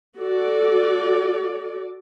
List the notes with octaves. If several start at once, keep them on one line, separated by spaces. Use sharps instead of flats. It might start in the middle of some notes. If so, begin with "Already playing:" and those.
F#4 A4 D5